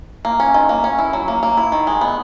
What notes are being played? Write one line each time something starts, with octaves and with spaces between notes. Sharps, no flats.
A#3
C#4
D#3
A#3
C#4
E4
F#3
A#3
A#3
E4
D#3
G#3
B3